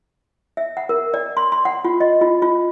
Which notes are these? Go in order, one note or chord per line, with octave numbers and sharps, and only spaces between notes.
E5
F#5
A#4
D5
C6
C6
F#5
F4
D#5
F4
F4